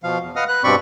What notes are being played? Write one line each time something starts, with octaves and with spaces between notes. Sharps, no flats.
B2 F3 F5
E2
B4 D#5 F5 F#5 D#6 F6
B4 F#6
G2 B2 C4 D5 B5 C#6